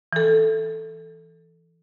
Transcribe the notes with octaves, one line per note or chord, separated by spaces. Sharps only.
E3 A4